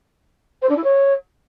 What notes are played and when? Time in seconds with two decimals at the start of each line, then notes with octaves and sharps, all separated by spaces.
0.62 C5
0.69 D4
0.76 E4
0.84 C#5